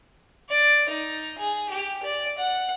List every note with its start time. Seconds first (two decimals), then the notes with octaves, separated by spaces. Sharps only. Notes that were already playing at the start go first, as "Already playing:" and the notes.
0.48 D5
0.89 D#4
1.38 G#4
1.69 G4
2.03 D5
2.38 F#5